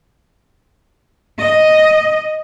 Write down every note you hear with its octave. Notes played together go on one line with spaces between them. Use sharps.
D#5